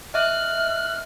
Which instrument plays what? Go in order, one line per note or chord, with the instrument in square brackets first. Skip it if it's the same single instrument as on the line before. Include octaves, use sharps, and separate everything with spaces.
[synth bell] D#5 E5 [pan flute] F6 [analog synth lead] F#6